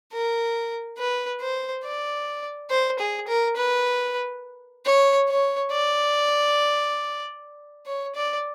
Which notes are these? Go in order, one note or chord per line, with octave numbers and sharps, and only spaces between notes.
A#4
B4
C5
D5
C5
G#4
A#4
B4
C#5
C#5
D5
C#5
D5